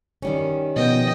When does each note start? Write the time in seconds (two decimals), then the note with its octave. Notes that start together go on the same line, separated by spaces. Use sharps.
0.22 D#3 G3 C#4
0.76 B2 F3 B3 D#5 G5